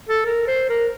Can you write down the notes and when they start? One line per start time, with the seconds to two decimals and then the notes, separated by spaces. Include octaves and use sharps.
0.09 A4
0.26 A#4
0.47 C5
0.69 A#4